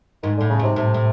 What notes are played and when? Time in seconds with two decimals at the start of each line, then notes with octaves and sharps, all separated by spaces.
0.23 G#2 D#3
0.37 A2 D3
0.50 C#3
0.59 G#2 C3
0.76 A2 C3
0.94 A2